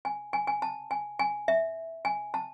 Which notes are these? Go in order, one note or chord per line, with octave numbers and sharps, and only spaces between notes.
G#5
G#5
G#5
A5
G#5
G#5
E5
G#5
A5